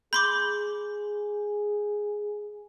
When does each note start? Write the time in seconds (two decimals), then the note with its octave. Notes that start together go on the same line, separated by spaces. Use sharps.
0.13 G#4 B5 C6 D6 G6